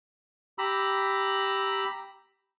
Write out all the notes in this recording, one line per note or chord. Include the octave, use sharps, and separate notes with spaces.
G4 A#5 B5 E6